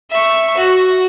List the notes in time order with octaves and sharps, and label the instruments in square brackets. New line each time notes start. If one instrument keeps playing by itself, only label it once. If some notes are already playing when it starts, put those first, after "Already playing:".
[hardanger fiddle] E5 C#6
F#4